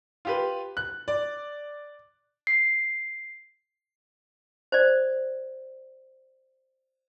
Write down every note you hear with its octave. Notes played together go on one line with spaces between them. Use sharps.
F4 G4 B4
F#6
D5
C7
C5 D5